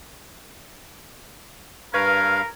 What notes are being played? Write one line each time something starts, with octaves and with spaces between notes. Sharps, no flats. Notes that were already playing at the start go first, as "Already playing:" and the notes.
G2 A#4 B4 F5 C#6 F6 G#6